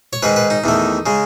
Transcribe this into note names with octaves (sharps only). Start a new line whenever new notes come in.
C#5
G#2 D#3 G#3 B4
B4
D#4
E2 D#3 A3
C#3 G#3